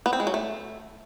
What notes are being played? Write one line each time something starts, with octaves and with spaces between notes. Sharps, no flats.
B3
C4
G#3
F#3
A3